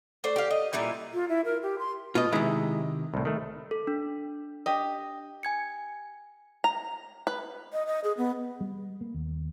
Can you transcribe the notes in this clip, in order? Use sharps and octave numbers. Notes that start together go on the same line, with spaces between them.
A3 C5 D5
G4 F5
D#5
A#2 G3 E4 G#5
F4
E4
A#4
G4
C6
B2 F4 D#5
C3 D#3 G#3 E4
C2 A2
D#3 A3
A4
D4
G4 D#5
G#5 G#6 C#7
A#5
B4
D#5
D#5
G#4
B3
G3
A#3
D#2